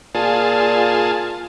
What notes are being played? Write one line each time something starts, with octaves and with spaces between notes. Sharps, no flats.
A#2 F4 G#4 A5